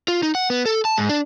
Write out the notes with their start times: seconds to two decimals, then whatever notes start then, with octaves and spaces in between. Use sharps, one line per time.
0.08 F4
0.23 D#4
0.35 F#5
0.50 B3
0.66 A4
0.85 A5
0.98 G#2
1.09 D4